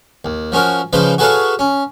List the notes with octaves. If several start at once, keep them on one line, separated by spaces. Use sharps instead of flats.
D#2
F3 C#4 F#4 A#4
C#3 F3 D#4 B4 C5
F#4 G#4 A4 B4 C#5 F5
C#4